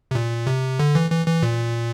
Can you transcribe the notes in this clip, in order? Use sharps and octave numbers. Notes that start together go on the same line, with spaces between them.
C3
A#2
C3
D3
E3
E3
E3
A#2